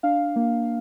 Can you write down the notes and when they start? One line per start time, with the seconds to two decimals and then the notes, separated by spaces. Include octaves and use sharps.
0.03 D4 F5
0.36 A#3